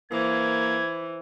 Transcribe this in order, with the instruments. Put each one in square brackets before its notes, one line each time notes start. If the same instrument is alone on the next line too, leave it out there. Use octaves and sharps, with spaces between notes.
[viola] E3 [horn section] A#3 [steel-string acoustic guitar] C5 [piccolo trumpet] G#6